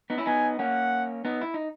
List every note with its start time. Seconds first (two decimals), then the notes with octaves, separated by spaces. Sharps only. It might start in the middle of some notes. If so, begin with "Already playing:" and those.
0.10 B3 D#4
0.18 C#4 E4
0.26 B3 D#4 G#5
0.59 A#3 C#4 F#5
1.25 B3 D#4
1.41 E4
1.54 D#4